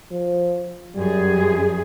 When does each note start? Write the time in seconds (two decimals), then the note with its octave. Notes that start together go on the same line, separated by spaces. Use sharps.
0.11 F3
0.95 F#2 G3 G#4